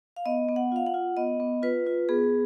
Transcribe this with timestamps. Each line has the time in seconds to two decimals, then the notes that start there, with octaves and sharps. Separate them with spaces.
0.16 F5
0.26 B3 D#5
0.49 B3
0.56 F#5
0.72 F4 F5
0.86 F#5
0.94 F4
1.17 B3 D#5
1.40 B3
1.63 F4 B4
1.86 F4
2.09 B3 G#4